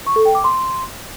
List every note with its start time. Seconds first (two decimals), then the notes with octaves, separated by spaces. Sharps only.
0.07 C#6
0.16 A4
0.25 G5
0.35 D6
0.44 C6